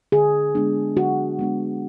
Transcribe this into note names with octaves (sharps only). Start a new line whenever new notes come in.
D3 G#4
G#3 B3 D4
D3 F#4
G#3 B3 D4